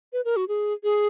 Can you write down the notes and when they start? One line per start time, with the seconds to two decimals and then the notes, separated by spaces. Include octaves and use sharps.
0.13 B4
0.25 A#4
0.36 F#4
0.48 G#4
0.83 G#4